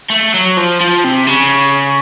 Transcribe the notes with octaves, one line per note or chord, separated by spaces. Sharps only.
A3
F#3
F3
F3
C3
C#3